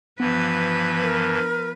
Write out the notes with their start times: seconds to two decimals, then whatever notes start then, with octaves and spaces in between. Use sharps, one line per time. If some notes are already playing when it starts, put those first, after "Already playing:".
0.20 G2 E3 F3 B3 B4
1.02 A#4